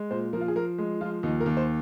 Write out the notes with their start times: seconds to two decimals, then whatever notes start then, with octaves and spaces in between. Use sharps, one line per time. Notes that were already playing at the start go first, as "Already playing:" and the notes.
Already playing: G#3
0.11 A#2 C5
0.33 F3 A#4
0.41 F4
0.48 G#4
0.56 F3 A#4
0.79 G#3
1.01 F3 F4
1.23 D#2 D#4
1.40 A#4
1.46 D#2
1.57 C5